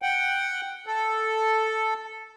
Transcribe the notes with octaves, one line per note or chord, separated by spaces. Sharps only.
F#5 G5
A4